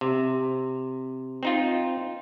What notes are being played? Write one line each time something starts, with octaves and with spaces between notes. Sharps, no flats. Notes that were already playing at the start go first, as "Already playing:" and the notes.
C3
C4 D#4 F4